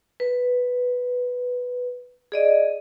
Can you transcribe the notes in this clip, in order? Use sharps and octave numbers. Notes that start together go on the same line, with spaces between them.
B4
G#4 D5 D#5